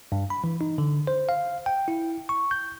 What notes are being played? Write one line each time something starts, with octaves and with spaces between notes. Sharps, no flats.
G2
B5
E3
D#4
D3
C5
F5
G5
E4
C#6
G6